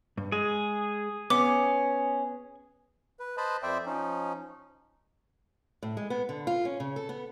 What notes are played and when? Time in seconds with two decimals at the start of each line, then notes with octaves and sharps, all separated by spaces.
0.18 G2
0.32 G#3 G#4
1.30 B3 C#4 D6
3.20 B4
3.37 B4 C5 D#5 A5 B5
3.63 F2 C5 D5 E5 G5
3.86 F3 C#4 D#4
5.83 A2
5.97 G#3
6.10 B3
6.29 D3
6.47 F4
6.65 C#4
6.80 C#3
6.96 A4
7.09 B3